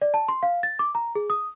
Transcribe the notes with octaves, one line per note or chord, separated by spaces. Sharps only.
D5
A5
C6
F5
A6
D6
A#5
G#4
D#6